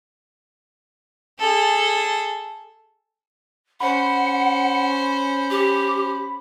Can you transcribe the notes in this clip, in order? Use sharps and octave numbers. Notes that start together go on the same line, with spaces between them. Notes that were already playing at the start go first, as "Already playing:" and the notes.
G#4 A4
C#4 C5 F#5 B5
G4